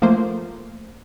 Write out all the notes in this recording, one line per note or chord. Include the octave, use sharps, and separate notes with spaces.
F3 A3 A#3 C5